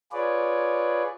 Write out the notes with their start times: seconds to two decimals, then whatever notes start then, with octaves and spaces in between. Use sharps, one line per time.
0.12 F4 G#4 B4 C#5 D5